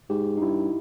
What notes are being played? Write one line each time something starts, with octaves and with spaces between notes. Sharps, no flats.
G#2 G4
D#4
G2 E4